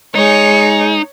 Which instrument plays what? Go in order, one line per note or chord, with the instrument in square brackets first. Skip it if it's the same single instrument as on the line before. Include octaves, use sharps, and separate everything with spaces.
[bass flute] G#3 [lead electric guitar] D#4 [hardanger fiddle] C#5